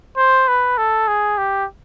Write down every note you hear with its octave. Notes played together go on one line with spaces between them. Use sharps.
C5
B4
A4
G#4
G4